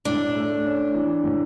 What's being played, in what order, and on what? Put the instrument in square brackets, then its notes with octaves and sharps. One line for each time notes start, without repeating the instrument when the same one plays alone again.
[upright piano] A2 [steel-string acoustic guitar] D4
[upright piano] A3
C#4
E3
A2